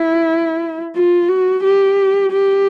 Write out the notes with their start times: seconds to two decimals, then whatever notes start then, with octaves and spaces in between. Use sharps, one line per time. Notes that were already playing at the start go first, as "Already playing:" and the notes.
Already playing: E4
0.95 F4
1.29 F#4
1.64 G4
2.32 G4